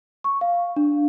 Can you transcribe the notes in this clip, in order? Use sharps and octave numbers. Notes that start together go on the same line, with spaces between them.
C#6
F5
D4